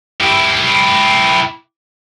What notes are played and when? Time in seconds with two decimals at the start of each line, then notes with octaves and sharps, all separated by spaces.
0.20 E4 G4